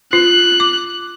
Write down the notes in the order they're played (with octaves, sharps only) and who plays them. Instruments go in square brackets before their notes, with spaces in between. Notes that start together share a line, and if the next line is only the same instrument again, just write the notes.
[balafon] F4 [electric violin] F#6
[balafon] D6